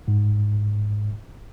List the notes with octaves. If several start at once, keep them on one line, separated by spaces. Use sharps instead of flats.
G#2